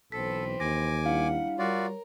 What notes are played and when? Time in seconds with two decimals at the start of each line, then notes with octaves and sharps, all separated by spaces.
0.12 B1 E3 C4 A4 B4 B6
0.60 D#2 G#5 D6 A#6
1.06 G3 D4 E4 F5 F#5
1.59 G3 F4 F#4 A#4 C#5 D5